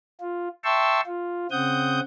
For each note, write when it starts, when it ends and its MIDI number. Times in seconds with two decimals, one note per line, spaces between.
0.21 0.48 65
0.64 1.01 76
0.64 1.01 79
0.64 1.01 81
0.64 1.01 84
0.64 1.01 85
0.64 1.01 88
1.07 1.47 65
1.51 2.00 49
1.51 2.00 60
1.51 2.00 78
1.51 2.00 87
1.51 2.00 91